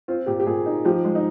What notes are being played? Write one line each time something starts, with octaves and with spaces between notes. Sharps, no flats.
C4 F4
A#2 G4
G4
A#2 G#4
D#4
F3 G4
G#3
D#4